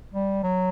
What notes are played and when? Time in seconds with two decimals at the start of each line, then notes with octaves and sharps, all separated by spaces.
0.14 G3
0.43 F#3